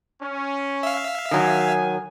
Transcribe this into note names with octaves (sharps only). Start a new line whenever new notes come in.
C#4
E5 F5
D#3 F#3 G#5